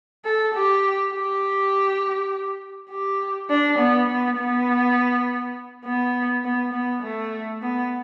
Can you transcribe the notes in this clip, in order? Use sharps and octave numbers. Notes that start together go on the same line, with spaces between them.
A4
G4
G4
G4
D4
B3
B3
B3
B3
B3
B3
A3
B3